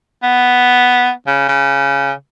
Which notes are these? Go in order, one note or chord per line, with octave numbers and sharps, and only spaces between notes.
B3
C#3
C#3